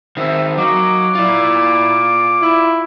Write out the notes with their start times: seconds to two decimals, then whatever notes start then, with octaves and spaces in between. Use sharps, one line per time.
0.17 D#3 C4 E5
0.58 F#3 A#3 D#4 D6
1.15 E4 F4 D5
2.41 E4